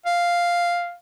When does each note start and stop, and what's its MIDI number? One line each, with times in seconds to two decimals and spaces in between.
0.06 0.95 77